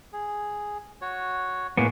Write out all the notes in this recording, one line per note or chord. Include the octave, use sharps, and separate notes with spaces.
G#4
F#4 C#5
A2 A#3 B3 D#4 F#4 G#4